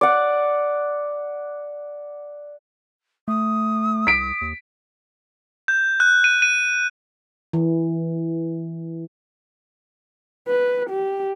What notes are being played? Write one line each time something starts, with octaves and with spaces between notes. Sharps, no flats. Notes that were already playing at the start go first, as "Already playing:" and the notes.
D5 F#5
A3 D#6
C2 B6 D7
D#2
G6
F#6
D#7
D#7
E3
B4
G4